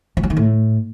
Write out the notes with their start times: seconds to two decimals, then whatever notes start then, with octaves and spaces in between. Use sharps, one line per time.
0.17 F3
0.23 F#3
0.30 D#3
0.37 A2